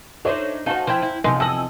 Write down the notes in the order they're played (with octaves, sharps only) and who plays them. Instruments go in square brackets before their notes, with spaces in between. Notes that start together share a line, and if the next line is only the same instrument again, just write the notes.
[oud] D4 D#4 C5 [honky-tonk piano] A4 C#5 E5
[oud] D#4 F#4 C5 [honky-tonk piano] F5 G#5 A5
[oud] F3 C4 E4 [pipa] C5 G5
[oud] E4
[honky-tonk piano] B1 [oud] E2 C3 F3 [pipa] G#3
[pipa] A4 D#5 [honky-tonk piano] G#5 E6 F#7